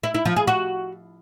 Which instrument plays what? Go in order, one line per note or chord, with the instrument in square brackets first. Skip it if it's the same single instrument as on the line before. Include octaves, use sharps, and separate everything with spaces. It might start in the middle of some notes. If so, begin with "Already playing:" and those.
[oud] E4
E4
F3
G#4
F#4